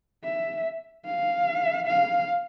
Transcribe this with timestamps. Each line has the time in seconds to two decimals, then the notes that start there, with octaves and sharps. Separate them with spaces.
0.24 E5
1.06 F5
1.87 F5